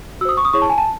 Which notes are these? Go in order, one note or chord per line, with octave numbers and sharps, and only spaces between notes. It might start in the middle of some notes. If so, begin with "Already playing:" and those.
F#4 C5 D#6 E6
C#6
D#6
E4 G#4 C#5 C#6
A5
G#5
A5